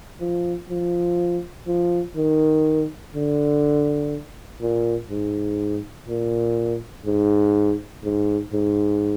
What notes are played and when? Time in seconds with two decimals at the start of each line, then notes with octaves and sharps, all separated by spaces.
0.20 F3
0.70 F3
1.67 F3
2.16 D#3
3.14 D3
4.61 A#2
5.10 G#2
6.08 A#2
7.06 G#2
8.04 G#2
8.53 G#2